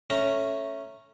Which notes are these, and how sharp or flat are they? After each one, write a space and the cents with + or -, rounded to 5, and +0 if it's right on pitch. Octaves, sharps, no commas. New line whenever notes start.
A3 +0 C#4 +0 A#5 +0